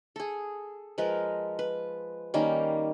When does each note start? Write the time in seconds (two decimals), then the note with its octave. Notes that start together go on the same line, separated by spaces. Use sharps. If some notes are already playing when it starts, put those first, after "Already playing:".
0.16 G#4 A4
0.98 F3 G#3 A#4 B4
1.59 B4
2.34 D#3 G3 A#3 C#4